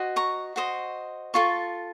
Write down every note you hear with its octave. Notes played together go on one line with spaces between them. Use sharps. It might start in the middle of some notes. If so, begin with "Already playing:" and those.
Already playing: F#4 C5 D#5
A#5 C#6
F#4 C5 D#5
F4 A4 C#6